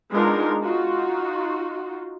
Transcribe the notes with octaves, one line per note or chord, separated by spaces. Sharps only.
G#3 B3 D4 D#4 F4 A#4
D#4 F4 F#4